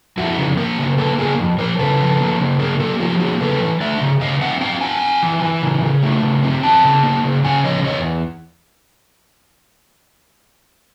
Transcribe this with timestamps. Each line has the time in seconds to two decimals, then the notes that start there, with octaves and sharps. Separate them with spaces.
0.17 F2 E4 F#4
0.37 C#3
0.57 A#3 A#4 C5
0.78 C#3
0.98 A#3 A4 B4
1.18 C#3 G#4 A#4
1.38 F2
1.58 F3 A#4 C5
1.79 C#3 A4 B4
1.99 F3
2.20 A#3
2.39 C#3
2.59 A#3 G#4 A#4
2.80 A#3 G4 A4
3.00 F3 F4 G4
3.20 A#3 F#4 G#4
3.40 C#3 A4 B4
3.61 E3
3.81 A3 D5 E5
4.01 C#3
4.20 C#3 D#5 F5
4.41 C4 E5 F#5
4.61 C4 F5 G5
4.81 C4 F#5 G#5
5.02 C4
5.23 E3
5.42 E3
5.62 C#3
5.82 C#3
6.03 A3
6.23 C#3
6.43 C4
6.63 E2 G5 A5
6.84 C#3
7.03 A#3
7.24 C#3
7.44 C#3 F#5 G#5
7.64 F3 C#5 D#5
7.84 E2 C#5 D#5